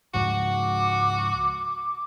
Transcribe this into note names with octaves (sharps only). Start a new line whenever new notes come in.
C#2 G#2 F3 F#4 D6